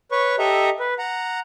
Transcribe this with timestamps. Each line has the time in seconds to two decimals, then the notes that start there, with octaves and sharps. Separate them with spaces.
0.11 B4 C#5 C#6
0.39 G4 A4 D#5 E5 A#5
0.80 B4
0.99 F#5 A#5